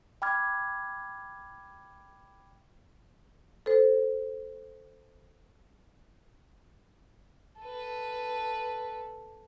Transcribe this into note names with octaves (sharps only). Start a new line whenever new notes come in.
G5 B5 D6 F6 G#6
A4 C5
A4 B4